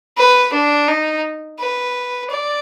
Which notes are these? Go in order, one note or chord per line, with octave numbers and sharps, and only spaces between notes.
B4
D4
D#4
B4
D5